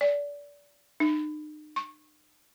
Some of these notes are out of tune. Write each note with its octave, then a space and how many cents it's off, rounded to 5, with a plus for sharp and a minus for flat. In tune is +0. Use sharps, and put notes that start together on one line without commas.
D5 -25
D#4 -40
C#6 -25